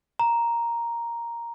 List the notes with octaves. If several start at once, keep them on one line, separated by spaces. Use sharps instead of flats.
A#5